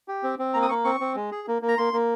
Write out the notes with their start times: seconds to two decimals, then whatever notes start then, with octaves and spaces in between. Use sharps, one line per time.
0.08 G4
0.23 C4
0.39 C4
0.54 A#3 A#5
0.62 D#6
0.69 A#3 C#6
0.85 C4 C#6
1.00 C4
1.16 G#3
1.32 G#4
1.48 A#3
1.62 A#3
1.68 A#5
1.78 A#3 C6
1.93 A#3